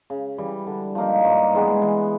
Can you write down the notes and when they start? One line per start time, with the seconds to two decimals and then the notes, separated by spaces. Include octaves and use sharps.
0.10 C#3
0.38 E3 G3
0.67 D3
0.95 F3 A#3 D#4
1.24 G2
1.53 E3 G#3 B3
1.82 E3